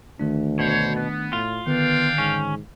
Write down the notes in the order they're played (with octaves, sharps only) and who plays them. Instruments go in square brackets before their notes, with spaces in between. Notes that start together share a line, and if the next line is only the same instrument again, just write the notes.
[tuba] D2 [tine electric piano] D#3 A3 D4
[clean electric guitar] B2 [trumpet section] C5 C#5
[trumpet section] B3
[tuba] A2 [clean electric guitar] F4
[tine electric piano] D3 D#3 [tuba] B3 [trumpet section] D4 F5 G5
[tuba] G#2 [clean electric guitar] C#4